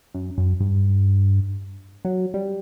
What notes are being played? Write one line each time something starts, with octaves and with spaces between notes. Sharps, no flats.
F#2
F#2
G2
F#3
G3